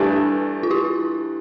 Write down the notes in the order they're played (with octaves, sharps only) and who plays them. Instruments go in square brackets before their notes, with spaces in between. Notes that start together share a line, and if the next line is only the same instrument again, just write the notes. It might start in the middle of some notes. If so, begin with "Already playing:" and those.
Already playing: [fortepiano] G2 E3 A3 D4 [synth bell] G4 B4
[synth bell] F4
E4 G4